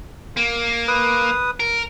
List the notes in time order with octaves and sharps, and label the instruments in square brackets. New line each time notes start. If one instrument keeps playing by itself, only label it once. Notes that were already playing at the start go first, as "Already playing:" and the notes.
[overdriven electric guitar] A#3
[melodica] B4 D#6
[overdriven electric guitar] A#4